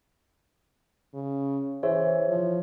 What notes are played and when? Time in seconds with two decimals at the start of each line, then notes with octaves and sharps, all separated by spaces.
1.14 C#3
1.83 E3 G#4 C5 C#5 E5
2.28 F3